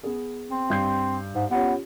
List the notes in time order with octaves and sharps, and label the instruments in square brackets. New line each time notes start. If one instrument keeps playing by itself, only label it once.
[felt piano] B3 G#4
[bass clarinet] C4
[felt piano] G2 G6 C7
[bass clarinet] G#2
[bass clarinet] B3 [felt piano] C#4 F4 G4